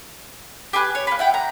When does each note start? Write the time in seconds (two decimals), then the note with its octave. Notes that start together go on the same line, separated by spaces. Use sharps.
0.73 G4 G#4 B4 F#6
0.95 C#5
1.07 A#3 B4
1.19 E4 F#5 G5
1.34 A#5